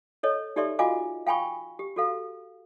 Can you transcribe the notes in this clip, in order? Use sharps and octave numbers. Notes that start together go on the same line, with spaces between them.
A4 C#5 D#5
D#4 G4 A4 D5 E5 C6
F4 F#4 D#5 F5 G#5 D6
F5 G5 G#5 B5 C#6
G4
F#4 A4 F5